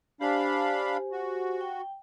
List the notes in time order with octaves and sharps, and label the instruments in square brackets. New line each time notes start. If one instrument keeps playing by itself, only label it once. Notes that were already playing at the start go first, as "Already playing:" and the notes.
[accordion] D4 F5 B5 [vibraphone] G4 C5 G#5
[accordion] F#4
[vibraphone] G5